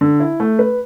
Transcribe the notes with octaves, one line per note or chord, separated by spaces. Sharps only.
D3
E4
A3
B4